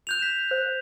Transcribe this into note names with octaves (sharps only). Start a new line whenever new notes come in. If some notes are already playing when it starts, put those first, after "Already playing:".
F#6 G6 F7
B6 E7
C5